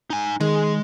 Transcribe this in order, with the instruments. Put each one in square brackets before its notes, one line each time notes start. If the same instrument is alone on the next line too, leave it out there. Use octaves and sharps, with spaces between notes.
[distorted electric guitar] D#4 G#5
[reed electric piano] D#3 [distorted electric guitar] G#3 [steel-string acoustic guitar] G#4